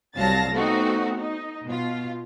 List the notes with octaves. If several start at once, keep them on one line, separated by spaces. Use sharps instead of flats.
C2 F#3 F5 A5 A6 A#6
A3 B3 C4 D#4 F#4
D#4
B2 F4